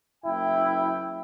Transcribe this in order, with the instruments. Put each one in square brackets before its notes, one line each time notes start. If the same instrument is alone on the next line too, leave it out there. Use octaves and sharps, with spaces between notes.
[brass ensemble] F#1 G5 [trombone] E4